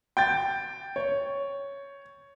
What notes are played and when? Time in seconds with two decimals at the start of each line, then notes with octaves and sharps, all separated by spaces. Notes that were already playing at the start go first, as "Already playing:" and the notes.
0.17 G5 G6 A6
0.96 C#5